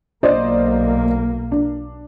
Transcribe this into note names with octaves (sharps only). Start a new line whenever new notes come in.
B1 A#3 C5 D5 D#5
D4